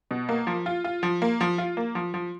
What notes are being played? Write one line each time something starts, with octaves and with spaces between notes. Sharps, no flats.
B2
A#3
F3
F4
F4
F3
A#3
F3
F4
A#3
F3
F3